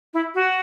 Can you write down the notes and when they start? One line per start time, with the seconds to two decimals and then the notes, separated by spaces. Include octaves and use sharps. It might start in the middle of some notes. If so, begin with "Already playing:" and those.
0.14 E4
0.35 F#4